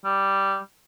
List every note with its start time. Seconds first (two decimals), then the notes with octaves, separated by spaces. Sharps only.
0.05 G3